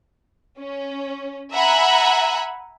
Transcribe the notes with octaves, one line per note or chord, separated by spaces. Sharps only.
C#4
E5 F#5 G#5 A#5 B5 F#6